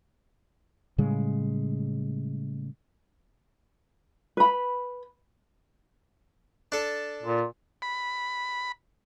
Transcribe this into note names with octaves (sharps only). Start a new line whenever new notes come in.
A2 C#3 G3 G#3
B4 B5
D4 A4
A#2
B5